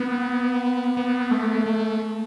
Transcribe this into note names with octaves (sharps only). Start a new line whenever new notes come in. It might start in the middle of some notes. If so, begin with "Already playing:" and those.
Already playing: B3
B3
A3
A3